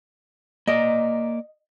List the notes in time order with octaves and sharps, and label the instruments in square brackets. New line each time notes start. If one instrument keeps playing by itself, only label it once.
[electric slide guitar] A#3 D5 [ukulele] D#5